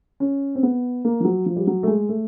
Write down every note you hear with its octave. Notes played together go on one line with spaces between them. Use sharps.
C#4
C4
B3
A#3
F3
F#3
F3
G3
F#3
A3
G#3
A3